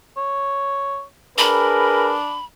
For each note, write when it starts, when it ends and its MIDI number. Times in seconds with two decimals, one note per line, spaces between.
0.17 1.03 73
1.38 2.37 62
1.38 2.17 68
1.38 2.17 70
1.38 2.17 71
1.38 2.45 83